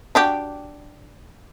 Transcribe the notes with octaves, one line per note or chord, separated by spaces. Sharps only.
D4 F#4 G4